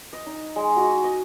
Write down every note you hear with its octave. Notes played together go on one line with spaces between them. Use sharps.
D#5
D#4
G#3
F#4
D#5